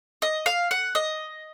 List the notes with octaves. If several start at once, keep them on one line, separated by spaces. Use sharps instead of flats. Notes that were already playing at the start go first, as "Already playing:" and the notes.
D#5
F5
F#5
D#5